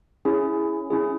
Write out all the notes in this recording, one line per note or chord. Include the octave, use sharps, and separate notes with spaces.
C#4 E4 G#4
C#4 E4 G#4